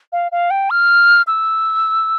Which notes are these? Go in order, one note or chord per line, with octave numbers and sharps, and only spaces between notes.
F5
F5
G5
F6
E6